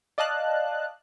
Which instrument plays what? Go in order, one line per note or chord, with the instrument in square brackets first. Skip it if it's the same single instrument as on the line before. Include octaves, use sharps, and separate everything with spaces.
[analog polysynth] D5 D#5 F5 A5 F#6